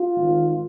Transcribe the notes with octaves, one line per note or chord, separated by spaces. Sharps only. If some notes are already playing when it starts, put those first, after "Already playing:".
Already playing: F4
G#1 G#2 D#3